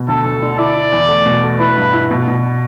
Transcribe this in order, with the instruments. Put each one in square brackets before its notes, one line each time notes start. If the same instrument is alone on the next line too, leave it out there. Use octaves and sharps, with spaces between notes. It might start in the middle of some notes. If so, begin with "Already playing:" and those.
Already playing: [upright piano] B2
[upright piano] D2 [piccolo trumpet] A4
[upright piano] D2
D3
[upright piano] E4 [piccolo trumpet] D5
[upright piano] E4
E2
A3
B2
A3
[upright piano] E4 [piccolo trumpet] B4
[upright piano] G2
E4
B2
B2